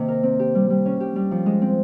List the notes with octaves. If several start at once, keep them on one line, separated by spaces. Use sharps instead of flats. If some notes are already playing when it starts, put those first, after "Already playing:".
Already playing: C3 D#3 A#3 D#4
A#4
C4
G4
G3
G3
C#4
G4
G3
F3
G#3
C4